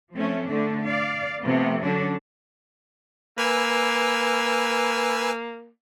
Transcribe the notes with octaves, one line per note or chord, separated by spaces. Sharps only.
F3 A3 C4 C#4
D3 A3 D4
D5 F5
C3 F3 A3 B3
D3 F#3 C#4 D4
A#3 B4 G#5 E6